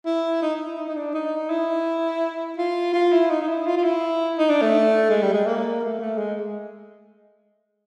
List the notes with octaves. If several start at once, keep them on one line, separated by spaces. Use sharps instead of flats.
E4
D#4
E4
D#4
D#4
D4
D#4
E4
F4
F4
E4
D#4
D#4
E4
F4
F4
E4
D#4
D4
A3
G#3
G3
G#3
A#3
A3
A3
G#3